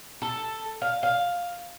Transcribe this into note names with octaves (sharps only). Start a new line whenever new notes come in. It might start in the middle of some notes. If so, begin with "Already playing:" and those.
A4
F5
F5